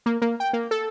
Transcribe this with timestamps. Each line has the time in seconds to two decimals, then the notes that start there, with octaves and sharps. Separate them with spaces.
0.06 A#3
0.22 A#3
0.40 G5
0.53 A#3
0.71 A4